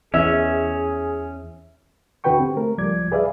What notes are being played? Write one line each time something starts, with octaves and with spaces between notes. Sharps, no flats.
E2 C#4 G#4 E5
D#2 D3 F#4 B4 G5 C#6
C4 G4
A3 A#4
C#2 F3 G3 D5 D6 G#6
G#4 B4 D5 E5 F5